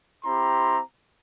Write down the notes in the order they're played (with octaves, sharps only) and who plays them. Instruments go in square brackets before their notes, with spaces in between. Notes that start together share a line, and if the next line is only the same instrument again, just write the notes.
[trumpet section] C4 E4 G4 A#5 C6